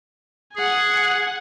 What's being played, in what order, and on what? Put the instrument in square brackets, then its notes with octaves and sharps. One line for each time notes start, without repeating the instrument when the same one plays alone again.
[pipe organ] G#4 [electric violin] F#5 G#5